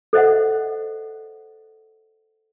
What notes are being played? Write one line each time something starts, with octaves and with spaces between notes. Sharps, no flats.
A4 C5 D#5 E5 F#5